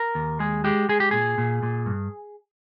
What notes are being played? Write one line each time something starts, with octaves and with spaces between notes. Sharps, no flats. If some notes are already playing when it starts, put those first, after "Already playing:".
Already playing: A#4
D#2
G#3 G#4
G#3 G4
G#3 G#4
G4
A#2 G#4
A#2
A#2
G2